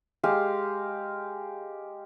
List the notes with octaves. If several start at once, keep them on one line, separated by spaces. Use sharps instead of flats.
G#3 G4 F5